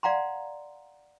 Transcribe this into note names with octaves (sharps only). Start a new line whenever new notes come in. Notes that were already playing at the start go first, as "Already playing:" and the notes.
D5 F5 F#5 A#5 C6